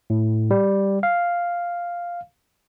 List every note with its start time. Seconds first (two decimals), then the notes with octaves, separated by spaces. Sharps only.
0.10 A2
0.51 G3
1.03 F5